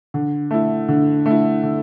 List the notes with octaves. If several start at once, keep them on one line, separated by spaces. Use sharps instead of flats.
D3
A3 E4
D3
A3 E4
D3